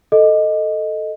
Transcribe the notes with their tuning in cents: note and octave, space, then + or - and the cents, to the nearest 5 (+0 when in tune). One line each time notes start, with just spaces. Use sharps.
A4 +0 D#5 +0